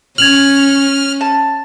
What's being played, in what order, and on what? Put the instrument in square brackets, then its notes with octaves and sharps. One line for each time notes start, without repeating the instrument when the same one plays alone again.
[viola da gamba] C#4 [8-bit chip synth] F6 [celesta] G#6 F7 F#7
[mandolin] A5